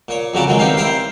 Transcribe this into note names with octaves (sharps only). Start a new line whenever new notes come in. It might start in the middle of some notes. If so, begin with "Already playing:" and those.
A#2 C#5
F2 C#3 F#3 F#4 D5
A#2 D#3 F#3 G#3
E2 D#3 G3 C4 D#4 F5
E4 A#4 C5 F5 G5 C6